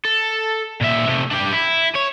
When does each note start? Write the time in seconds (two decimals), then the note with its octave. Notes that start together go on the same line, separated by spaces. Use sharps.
0.05 A4
0.81 A#2 E5
1.07 C3 A3
1.31 D4 G4
1.53 E4
1.96 C#5